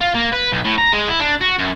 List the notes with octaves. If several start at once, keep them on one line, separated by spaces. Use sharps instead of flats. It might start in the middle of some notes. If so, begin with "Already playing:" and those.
F4
A#3
B4
B1
A2
A#5
G#3
E4
D4
F#4
F#2